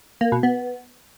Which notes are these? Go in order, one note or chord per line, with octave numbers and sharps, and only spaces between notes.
A#3
B2
B3